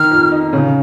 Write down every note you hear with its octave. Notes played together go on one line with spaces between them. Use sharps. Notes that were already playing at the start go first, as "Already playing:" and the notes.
Already playing: D#3 F6
F2
D#4
C#3